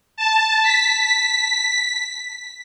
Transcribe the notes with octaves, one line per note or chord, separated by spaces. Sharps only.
A5
B6